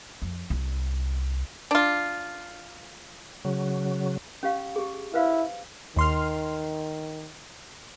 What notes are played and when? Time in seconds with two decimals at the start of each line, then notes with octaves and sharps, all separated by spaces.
0.22 F2
0.50 C2
1.71 D4 F4
3.45 C#3 F#3
4.43 C#4 G4 F5
4.76 G4 G#4
5.14 E4 B4 C5 F5
5.96 D#2 D#3 C6 F6